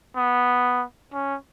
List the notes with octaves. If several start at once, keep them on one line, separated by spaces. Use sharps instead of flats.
B3
C#4